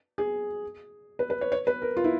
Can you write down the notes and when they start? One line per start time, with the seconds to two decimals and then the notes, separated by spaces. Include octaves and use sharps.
0.18 G#4
1.19 B4
1.30 B4
1.41 C#5
1.52 C#5
1.67 B4
1.82 A#4
1.97 F4
2.04 E4